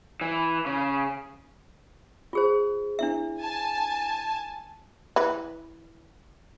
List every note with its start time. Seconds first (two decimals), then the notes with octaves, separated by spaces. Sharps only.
0.21 E3
0.66 C#3
2.33 F4 G#4 C5
2.99 D4 E4 E5
3.41 G#5 A5
5.16 E3 B4